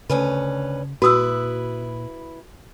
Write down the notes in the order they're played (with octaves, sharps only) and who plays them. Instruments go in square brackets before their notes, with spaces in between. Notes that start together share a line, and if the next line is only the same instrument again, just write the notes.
[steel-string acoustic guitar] D2 C#4 B4 [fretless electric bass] C#3
[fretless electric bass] A#2 [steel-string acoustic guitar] E4 B4 [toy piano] F#4 D#6 E6